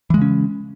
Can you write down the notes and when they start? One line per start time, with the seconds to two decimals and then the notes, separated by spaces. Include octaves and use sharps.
0.10 E3
0.14 G#3
0.18 C#3
0.22 C#4